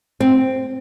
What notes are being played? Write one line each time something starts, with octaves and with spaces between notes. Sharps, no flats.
C4